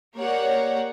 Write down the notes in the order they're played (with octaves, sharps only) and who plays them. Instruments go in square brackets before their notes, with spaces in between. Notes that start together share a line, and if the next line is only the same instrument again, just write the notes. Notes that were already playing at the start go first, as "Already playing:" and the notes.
[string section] A#3 G4 A#4 C#5 D5 F#5